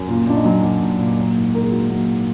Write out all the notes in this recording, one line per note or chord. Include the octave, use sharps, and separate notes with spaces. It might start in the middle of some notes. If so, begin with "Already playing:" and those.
Already playing: F#2
A#2 F4
A#2 D4
D#4
F#3
F#3
A#2
A#2
F#3
G#2
G#2 A#4
G#4
D#3 F#4
F#3
G#2